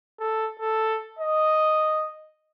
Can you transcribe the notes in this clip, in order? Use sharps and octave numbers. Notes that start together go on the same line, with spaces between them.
A4
A4
D#5